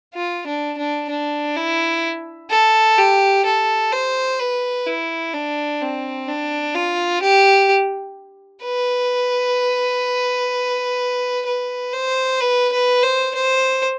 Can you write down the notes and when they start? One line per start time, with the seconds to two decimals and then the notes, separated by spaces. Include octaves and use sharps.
0.14 F4
0.46 D4
0.78 D4
1.10 D4
1.56 E4
2.50 A4
2.98 G4
3.45 A4
3.92 C5
4.39 B4
4.86 E4
5.33 D4
5.81 C4
6.28 D4
6.74 F4
7.22 G4
8.63 B4
11.46 B4
11.93 C5
12.41 B4
12.72 B4
13.03 C5
13.35 C5